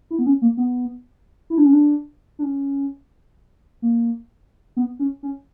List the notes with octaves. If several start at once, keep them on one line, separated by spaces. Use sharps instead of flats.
E4
B3
C#4
A#3
B3
E4
D4
C#4
D4
D4
C#4
A#3
B3
C#4
C#4